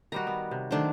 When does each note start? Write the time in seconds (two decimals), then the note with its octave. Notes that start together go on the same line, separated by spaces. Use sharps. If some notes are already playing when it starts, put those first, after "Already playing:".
0.12 D#3 G3 F#4 A#5
0.27 B3
0.51 C3
0.71 D#3 F#3 A3 D4 C5